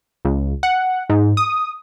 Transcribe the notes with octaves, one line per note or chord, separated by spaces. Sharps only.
C#2
F#5
G#2
D#6